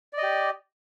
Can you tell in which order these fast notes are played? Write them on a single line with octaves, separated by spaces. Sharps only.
D5 D#5 G4